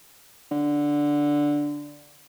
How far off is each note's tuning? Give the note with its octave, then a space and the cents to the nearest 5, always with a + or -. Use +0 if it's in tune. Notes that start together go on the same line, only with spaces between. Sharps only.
D3 -5